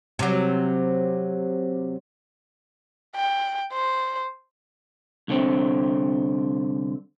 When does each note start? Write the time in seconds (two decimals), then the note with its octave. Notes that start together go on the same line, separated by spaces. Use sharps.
0.19 C3 F#3
3.15 G5
3.73 C5
5.28 C2 D3 C4